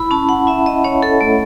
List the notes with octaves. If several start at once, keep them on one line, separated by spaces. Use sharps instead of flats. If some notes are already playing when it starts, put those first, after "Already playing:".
Already playing: E4 B5
C#4 A5
F#5
E4 E5
D#5
C#4 C#5
A4
A3